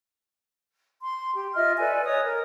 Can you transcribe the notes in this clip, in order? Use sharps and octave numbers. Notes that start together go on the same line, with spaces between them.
C6
G4
F4 D#5 E5 F6
A4 B4 D5 G#5
C#5 D#5 D#6
A#4